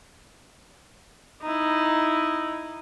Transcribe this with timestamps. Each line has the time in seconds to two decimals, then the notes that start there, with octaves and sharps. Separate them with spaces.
1.42 D#4 E4